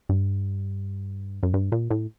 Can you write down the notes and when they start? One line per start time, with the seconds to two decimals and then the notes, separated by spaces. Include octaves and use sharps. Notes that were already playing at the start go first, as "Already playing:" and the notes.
0.09 G2
1.43 F#2
1.54 G2
1.72 A#2
1.90 A2